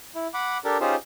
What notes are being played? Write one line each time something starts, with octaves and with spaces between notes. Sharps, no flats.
E4
F#5 B5 D6
D4 G4 A4 A#4
C#4 D#4 F4 G4 G#4 C5